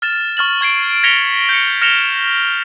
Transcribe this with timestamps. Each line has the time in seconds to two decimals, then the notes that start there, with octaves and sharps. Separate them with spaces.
0.02 F6 A6 E7
0.37 C#6 F6 A6 F#7
0.61 C#6 G#6 C7 D7
1.03 G#6 A#6 B6 C#7 F7 G7
1.49 G6 C#7
1.82 F6 A#6 C#7 E7 F7 G7